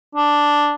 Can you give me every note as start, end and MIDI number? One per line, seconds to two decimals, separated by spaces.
0.15 0.74 62